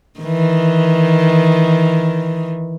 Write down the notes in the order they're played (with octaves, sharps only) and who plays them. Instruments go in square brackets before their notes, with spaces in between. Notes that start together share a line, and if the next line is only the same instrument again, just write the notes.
[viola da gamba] D#3 E3